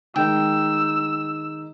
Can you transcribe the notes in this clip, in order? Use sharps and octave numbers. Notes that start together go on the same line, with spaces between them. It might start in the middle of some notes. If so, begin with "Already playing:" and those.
D#3 G#3 D#4 G5 E6